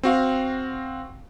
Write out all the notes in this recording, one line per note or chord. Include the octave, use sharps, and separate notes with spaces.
C4 F#4 F5